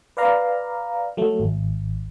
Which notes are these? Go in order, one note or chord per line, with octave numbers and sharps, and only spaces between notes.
B4 D5 F5 A#5
F#3 A3
G#1